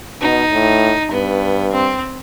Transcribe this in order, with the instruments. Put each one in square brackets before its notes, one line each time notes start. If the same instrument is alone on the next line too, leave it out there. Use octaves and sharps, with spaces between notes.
[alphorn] B2 [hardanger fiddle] D#4
[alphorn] A2
[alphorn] G2 [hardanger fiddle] B3
[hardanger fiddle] C4